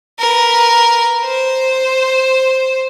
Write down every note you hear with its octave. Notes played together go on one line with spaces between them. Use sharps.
A#4 B4
C5